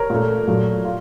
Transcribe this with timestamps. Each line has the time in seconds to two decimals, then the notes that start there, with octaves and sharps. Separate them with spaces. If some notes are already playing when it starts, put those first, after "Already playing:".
Already playing: A#4 C#5
0.10 A#2 A3
0.47 A#2 F#3 A3
0.85 F4